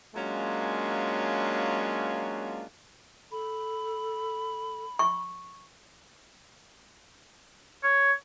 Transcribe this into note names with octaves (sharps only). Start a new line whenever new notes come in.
F#3 G#3 A#3 C#4 D4 F4
A4 B5
C#6
C#5